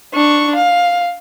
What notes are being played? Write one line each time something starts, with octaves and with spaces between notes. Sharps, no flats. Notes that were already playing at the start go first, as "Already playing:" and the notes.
D4 C#6
F5